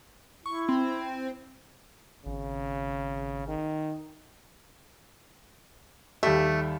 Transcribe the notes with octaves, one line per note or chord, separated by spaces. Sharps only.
E4 C#6
C4
G#1 C#3
D#3
D#2 G3 A3 G4